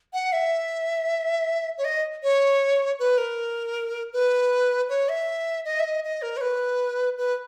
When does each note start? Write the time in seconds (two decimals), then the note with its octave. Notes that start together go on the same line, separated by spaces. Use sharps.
0.13 F#5
0.33 E5
1.78 C#5
1.85 D#5
2.23 C#5
2.99 B4
3.18 A#4
4.13 B4
4.89 C#5
5.09 E5
5.65 D#5
5.80 E5
5.84 D#5
6.04 D#5
6.22 A#4
6.37 C#5
6.41 B4
7.18 B4